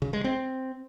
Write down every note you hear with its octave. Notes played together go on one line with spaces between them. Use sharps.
C#3
G#3
C4